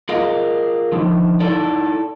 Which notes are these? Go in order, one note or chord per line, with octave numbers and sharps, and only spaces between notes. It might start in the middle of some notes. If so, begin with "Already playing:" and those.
F4 G#4 A#4 D#5 F5
D3 D#3 F3
D#4 E4 A4 D5